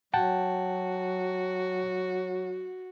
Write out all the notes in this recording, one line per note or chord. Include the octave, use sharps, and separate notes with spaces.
F#3 F#4 F#5 G5 A5